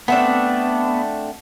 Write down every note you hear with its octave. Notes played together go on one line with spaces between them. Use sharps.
A3 B3 C4 D4 F#5